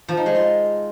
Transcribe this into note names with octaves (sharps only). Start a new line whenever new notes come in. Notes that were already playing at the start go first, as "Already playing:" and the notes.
F3
D#4
G#3
F4